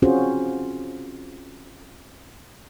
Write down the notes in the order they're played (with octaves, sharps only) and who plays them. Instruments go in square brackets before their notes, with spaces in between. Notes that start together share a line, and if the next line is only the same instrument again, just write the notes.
[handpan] C4 C#4 F4 F#4 G#4 C5